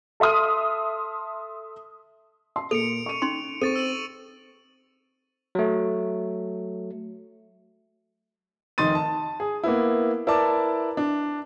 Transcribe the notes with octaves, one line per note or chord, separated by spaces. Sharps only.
A4 E5 C6 D#6 F6
C6
A#2 A4 C#7 D7 F7
C#6 D#7
C#4 D#4 C6
C4 A4 C#6 A6 D#7
E6 D#7 F#7
F#3 A3
F1 D#3 D#4 C6 A6 D#7
A5
G#4
A#3 B3 E4
E4 A#4 B4 D5 A5 D6
D4